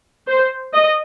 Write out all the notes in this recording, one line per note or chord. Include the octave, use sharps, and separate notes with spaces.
C5
D#5